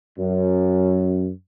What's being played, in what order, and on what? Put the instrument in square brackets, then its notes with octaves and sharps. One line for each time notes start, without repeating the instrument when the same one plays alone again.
[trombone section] F#2